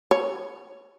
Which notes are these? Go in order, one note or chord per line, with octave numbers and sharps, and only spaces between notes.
C#5